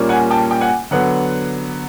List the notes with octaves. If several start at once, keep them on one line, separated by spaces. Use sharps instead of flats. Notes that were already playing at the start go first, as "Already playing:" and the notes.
Already playing: A#2 G3 A#3 C#4
F#5 G#5
G5 A5
G5
F#5 G#5
D3 F#3 B3 F#5